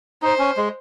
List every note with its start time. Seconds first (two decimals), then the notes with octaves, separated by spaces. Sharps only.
0.22 D#4 C5
0.39 C#4
0.57 G#3